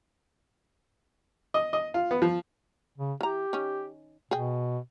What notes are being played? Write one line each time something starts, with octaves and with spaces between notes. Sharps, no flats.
D#5
D#5
F4
B3
F3
C#3
E3 G4 A#5
D#3 C#4
B2 G#4 G5